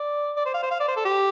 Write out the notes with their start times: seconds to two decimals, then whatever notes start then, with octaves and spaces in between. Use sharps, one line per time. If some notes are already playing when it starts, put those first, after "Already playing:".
Already playing: D5
0.37 D5
0.46 C5
0.54 F5
0.63 C5
0.71 F5
0.80 D5
0.88 C5
0.96 A4
1.05 G4